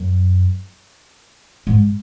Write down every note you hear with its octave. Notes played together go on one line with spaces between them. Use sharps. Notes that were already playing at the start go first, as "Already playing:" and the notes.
Already playing: F#2
G#2